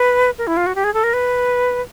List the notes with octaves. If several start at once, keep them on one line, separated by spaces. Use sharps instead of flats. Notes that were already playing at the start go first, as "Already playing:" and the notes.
Already playing: B4
A#4
E4
F4
F#4
G4
G#4
A4
A#4
B4